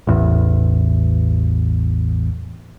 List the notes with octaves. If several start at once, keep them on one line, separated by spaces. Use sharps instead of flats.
A1 E2